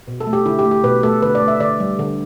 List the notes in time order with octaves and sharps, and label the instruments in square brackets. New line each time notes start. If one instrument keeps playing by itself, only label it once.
[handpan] B2
A4
A3
G4
D3 E4
G4
A3
G4
B2 B4
A3 A4
D3 B4
D5
A3
E5
D3 D5
G3
D3